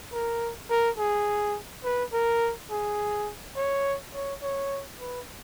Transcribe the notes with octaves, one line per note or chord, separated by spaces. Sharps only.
A#4
A#4
G#4
B4
A#4
G#4
C#5
C#5
C#5
B4